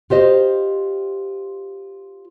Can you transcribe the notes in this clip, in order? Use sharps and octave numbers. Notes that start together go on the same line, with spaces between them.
F4 G4 C5 D#5